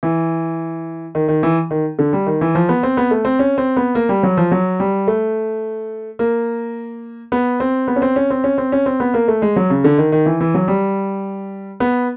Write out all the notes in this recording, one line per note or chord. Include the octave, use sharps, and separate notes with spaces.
E3
D#3
D#3
E3
D#3
D3
G3
D#3
E3
F3
B3
C4
B3
A3
C4
C#4
C4
B3
A#3
G3
F#3
F3
F#3
G3
A3
A#3
B3
C4
B3
C#4
C4
C#4
C4
C#4
C4
C#4
C4
B3
A#3
A3
G#3
F#3
C#3
D3
D#3
D#3
E3
E3
F#3
G3
B3